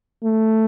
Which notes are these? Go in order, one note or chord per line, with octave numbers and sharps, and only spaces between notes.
A3